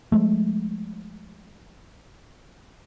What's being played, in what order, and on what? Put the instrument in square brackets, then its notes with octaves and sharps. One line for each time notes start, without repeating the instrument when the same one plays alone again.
[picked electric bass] F3 G#3 A3